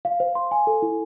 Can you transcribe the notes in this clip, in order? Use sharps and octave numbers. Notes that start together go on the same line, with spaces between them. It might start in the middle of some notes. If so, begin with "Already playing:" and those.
F5
C5
C6
G#5
A4
E4